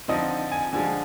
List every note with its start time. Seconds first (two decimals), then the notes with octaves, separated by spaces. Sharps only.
0.08 D3 F3 C4 D#4 D#5
0.52 G#5
0.73 D3 F3 G#3 G#5